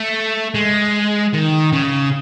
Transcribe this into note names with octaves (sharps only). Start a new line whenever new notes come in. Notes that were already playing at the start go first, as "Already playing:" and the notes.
Already playing: A3
G#3
D#3
C#3